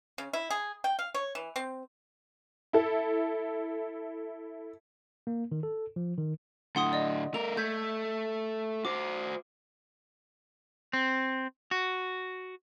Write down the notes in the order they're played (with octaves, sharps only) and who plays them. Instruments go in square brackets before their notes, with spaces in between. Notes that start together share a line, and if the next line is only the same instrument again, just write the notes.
[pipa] C#3
E4
G#4
G5
F5
C#5
E3
C4
[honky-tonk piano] E4 A4
[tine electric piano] A#3
D#3
A4
F3
D#3
[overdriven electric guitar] A2 D3 [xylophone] F#5 C6 D#6
[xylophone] D5 D#5
[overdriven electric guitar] A3 A#4 [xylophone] F7
[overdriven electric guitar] A3 [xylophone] G6 G#6 B6
[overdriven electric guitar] F#4 C5 [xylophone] D6
[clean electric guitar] C4
F#4